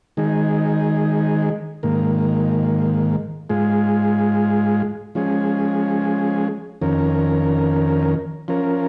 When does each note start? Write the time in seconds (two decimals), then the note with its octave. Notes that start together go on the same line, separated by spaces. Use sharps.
0.17 D#3 G#3 D#4 G#4
1.83 G#2 D#3 A#3
3.50 G#2 G#3 F4 G#4
5.15 F3 G#3 C#4 G#4
6.81 F2 D#3 C#4 A#4
8.48 F3 C#4 A#4